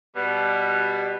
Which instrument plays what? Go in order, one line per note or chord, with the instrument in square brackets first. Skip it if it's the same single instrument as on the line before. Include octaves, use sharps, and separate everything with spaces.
[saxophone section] B2 G3